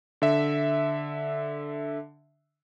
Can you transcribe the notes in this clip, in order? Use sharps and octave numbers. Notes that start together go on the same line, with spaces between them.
D3 E5